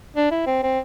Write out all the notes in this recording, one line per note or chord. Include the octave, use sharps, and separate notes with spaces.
D4
E4
C4
C4